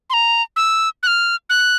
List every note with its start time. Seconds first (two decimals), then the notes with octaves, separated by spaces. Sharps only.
0.10 C6
0.13 A#5
0.56 E6
1.03 F#6
1.07 F6
1.50 F#6